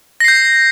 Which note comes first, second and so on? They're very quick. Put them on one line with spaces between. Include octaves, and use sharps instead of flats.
A#6 C7 G6